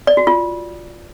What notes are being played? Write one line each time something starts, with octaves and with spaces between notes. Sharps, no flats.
D5
F#4
F4